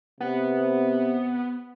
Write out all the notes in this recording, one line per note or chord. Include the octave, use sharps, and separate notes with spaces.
C3 B3